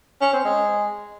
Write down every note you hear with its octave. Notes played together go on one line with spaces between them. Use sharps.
C#4
C4
G#3